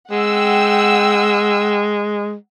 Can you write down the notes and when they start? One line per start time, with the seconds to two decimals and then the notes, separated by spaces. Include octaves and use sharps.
0.11 G#3 F#5 G5 E6